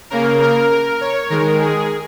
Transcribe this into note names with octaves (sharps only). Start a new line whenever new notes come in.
C#3 A#3 A#4
A#4
A#4
C#5
D#3 G#3 A#4
G#4